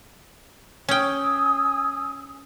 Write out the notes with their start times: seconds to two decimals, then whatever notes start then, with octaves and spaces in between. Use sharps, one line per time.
0.89 C#4 G5 G#5 D#6 E6